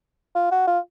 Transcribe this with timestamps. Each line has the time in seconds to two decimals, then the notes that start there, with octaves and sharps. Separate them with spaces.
0.35 F4
0.52 F#4
0.67 F4